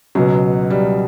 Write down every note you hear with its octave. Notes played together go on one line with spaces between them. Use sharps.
C#2 B2 F#3
G3